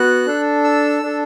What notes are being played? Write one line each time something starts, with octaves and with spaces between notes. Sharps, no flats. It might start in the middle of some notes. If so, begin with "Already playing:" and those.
Already playing: B3 F#4 F#6
D4 A4
E6
D4 A4